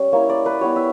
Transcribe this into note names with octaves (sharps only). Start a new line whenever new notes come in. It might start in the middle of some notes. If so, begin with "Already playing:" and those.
Already playing: G3 C#4
A#3 E4 C#5
D5
B4
G3 B3 E4 C#5
E5